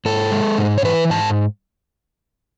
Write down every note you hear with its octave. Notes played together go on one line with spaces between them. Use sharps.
G#2 A4
G#3
G#2
C#5
E3 B4
G#2 A5